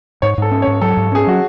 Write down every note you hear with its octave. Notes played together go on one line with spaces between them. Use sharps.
G#2 C#5
G#2 A4
C#4
C#5
G#2
F#3 A4
G#2
C#4 G#4
F#3 F#4